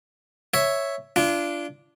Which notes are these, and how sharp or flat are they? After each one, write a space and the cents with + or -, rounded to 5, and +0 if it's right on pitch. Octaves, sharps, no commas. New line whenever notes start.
C#5 +0 E5 +0
D4 -5 F4 -30